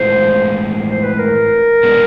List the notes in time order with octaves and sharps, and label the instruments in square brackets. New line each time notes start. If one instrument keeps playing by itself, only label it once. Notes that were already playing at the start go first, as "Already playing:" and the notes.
Already playing: [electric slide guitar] A2 E3 G#3 C4 F4 [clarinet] C5
[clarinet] C5
B4
A#4
[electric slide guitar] B2 G#3 B3 D4